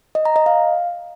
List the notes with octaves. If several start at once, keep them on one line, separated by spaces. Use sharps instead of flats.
D#5
A#5
D#5
F5